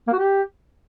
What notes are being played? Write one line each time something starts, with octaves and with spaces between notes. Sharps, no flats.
A#3
F#4
G4